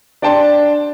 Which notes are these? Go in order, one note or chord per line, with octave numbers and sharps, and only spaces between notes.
D4 D5 G5 A5 C6